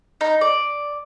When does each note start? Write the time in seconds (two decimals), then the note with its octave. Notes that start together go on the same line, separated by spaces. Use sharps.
0.21 D#4
0.41 D5